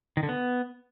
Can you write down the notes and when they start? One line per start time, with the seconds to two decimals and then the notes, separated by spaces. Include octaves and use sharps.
0.17 D#3
0.23 D3
0.29 B3